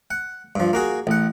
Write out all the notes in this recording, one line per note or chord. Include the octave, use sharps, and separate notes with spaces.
F#5
G2 F3
A#3 F#4 G#4
A1 F#5